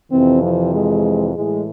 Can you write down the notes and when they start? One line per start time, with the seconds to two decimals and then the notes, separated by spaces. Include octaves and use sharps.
0.12 F2 C3 E3 C4
0.42 F3
0.73 G#3
1.34 A2 E3 G#3